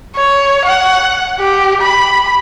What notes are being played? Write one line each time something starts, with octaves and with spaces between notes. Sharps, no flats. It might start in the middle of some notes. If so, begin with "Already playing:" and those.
C#5
F#5
G4
B5